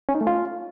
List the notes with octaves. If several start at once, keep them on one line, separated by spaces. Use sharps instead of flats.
C#4
D#4
A3
F4